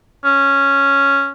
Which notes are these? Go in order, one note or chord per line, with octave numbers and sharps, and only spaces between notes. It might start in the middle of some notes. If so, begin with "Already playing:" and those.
C#4